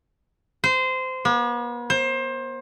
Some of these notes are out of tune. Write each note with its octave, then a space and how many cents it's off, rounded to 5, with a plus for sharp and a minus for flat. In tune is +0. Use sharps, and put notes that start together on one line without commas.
C5 -20
B3 -45
C5 +25